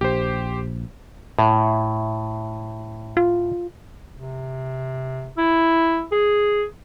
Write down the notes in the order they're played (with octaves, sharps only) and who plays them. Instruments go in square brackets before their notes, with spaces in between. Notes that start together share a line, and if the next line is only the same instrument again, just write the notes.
[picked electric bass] A#1 [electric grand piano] G4 C5
[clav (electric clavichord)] A2
[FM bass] F4
[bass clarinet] C3
E4
G#4